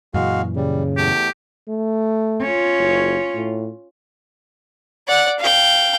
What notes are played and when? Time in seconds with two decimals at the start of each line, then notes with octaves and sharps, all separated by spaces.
0.14 F#2 A#2 E3 G#3 F#4 F5
0.56 C#3 G3
0.97 E2 A3 G4
1.69 A3
2.42 C#4 F4
2.78 F#1
3.34 A2
5.08 D5 F#5
5.39 F5 G5